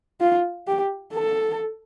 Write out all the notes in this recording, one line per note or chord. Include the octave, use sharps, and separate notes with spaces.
F4
G4
A4